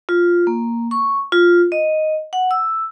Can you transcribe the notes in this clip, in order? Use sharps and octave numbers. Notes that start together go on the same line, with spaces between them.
F4
A#3
C#6
F4
D#5
F#5
E6